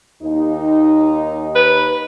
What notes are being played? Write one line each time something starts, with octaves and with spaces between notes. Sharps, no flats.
D#2 D#4
B4